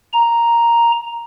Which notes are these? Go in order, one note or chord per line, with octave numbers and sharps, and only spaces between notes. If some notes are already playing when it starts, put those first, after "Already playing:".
A#5